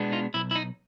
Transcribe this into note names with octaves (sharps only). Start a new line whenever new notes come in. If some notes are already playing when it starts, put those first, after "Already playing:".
Already playing: B2 G#3 B3 D4
D#4 F4
B1 E4
E4
D#4